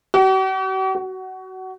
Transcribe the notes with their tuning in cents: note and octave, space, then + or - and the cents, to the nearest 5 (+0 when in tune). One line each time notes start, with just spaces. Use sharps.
F#4 +45
F#4 +20